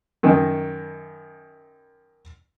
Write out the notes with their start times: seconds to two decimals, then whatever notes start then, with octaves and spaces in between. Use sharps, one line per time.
0.23 F#2 D#3 D#5